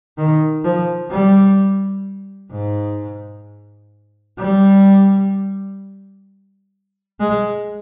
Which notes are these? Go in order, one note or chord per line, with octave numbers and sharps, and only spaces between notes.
D#3
F3
G3
G#2
G3
G#3